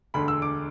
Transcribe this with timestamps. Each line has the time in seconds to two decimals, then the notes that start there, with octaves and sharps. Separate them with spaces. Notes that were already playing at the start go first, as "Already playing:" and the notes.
0.14 E1 D2 D3 B5
0.28 E6
0.42 D6